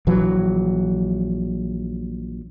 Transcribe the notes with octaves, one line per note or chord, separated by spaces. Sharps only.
A#1 E3 F#3